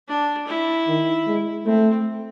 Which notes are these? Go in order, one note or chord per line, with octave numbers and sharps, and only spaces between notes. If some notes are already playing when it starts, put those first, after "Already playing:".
D4
E4
D#3
G#3
A3 C4